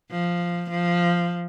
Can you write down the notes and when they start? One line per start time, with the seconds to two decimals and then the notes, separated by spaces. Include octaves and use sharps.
0.11 F3
0.70 F3